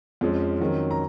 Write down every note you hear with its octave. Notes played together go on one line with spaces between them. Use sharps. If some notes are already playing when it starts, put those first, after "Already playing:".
F2 F3 G#3 C#4
F2 D#3 F#3 C#4
A#5